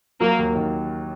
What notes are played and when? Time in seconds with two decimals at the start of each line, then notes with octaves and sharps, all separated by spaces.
0.21 F#3 A#3
0.39 D#2
0.55 D#3